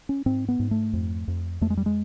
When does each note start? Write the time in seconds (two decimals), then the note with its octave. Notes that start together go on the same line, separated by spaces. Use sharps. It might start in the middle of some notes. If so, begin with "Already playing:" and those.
0.09 C#4
0.26 G#2 C4
0.48 B3
0.59 G#2
0.71 A3
0.93 F2
1.28 F2
1.61 F2 A3
1.70 G#3
1.77 G3
1.86 G#3